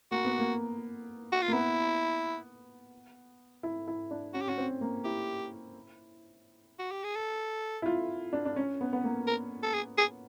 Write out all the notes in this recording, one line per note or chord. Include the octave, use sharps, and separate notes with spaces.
A#3 F#4
B3
A#3
F#4
F4
A#3
B3 E4
E4
E4
D4
C#4 F#4
G4
C#4 F#4
C4
A#3
E4 G4
F#4
G4
G#4
A4
E4
F4
D4
D4
C#4
B3
B3
A#3
A#4
A4
G#4
G#4